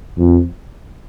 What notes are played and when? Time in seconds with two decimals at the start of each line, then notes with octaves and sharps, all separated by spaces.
0.17 F2